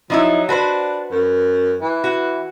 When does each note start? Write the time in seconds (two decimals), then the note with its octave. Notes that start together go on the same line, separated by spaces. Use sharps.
0.10 F3 F#3 D#4 E4
0.49 D4 F#4 B4 C5
1.11 F#2
1.82 E3
2.04 F#4